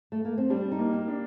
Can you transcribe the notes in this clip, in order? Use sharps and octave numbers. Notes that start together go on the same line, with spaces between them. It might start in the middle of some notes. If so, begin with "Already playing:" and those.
A3
A#3
C4
G3 D4
D#4
A#3
G4
D4